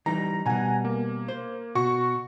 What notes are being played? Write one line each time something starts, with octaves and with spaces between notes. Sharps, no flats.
E3 G3 D#4 A#5
B2 G3 F#5 G#5 A#5
A#3
C5
B2 F#4 C#6